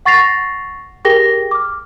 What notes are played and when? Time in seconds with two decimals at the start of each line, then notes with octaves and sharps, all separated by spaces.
0.05 F#5 C#6 A6 A#6 C7 F7
1.05 G4 G#4 A#4 G5 A#6 G7
1.51 D6 F6